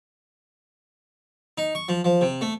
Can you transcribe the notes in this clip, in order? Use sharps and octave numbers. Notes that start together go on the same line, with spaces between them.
D#4
C#6
F3
F3
C3
A3